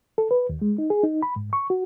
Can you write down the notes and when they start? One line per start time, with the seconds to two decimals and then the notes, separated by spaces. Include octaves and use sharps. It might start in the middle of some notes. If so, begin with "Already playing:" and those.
0.18 A4
0.31 B4
0.49 D#2
0.62 G#3
0.78 D#4
0.90 G#4
1.03 D#4
1.22 B5
1.36 G#2
1.53 C#6
1.70 F#4